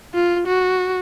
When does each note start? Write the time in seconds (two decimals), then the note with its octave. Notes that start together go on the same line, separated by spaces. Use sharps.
0.14 F4
0.47 F#4